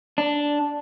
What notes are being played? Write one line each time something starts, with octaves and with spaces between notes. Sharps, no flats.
D4